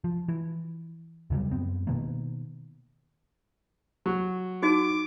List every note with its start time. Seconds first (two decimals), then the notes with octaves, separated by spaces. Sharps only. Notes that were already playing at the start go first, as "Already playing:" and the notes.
0.04 F3
0.29 E3
1.30 D#2 C#3 F#3 G3
1.51 F#2 B3 C4
1.87 B2 D#3 A#3
4.06 F#3
4.63 D#4 F#4 D6